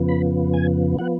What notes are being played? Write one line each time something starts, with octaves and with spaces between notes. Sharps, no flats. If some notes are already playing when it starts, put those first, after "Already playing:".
Already playing: F2 C#3 F3 B3
B5
G#5
F3 B3 F#5